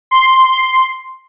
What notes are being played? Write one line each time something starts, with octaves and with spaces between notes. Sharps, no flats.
C6